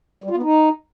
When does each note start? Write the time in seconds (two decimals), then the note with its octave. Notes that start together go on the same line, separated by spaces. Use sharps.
0.24 G3
0.30 F4
0.36 B3
0.43 D#4